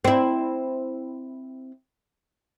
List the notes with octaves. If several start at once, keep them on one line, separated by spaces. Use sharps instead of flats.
C4 E4